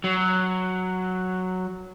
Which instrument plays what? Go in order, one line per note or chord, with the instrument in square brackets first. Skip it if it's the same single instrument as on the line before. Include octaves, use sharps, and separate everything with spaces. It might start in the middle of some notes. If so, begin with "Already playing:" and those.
[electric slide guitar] F#3